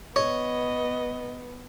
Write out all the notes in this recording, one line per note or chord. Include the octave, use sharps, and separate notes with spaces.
B3 C#5 D#5